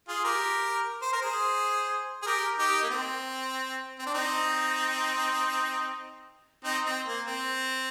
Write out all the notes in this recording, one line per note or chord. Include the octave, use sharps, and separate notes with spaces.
F4 G#4
G4 A#4
C5
A#4
G#4 C5
G#4
G4 A#4
D#4 G4
A#3
C4
C4
D4
C4 D#4
C4 D#4
C4
A#3
C4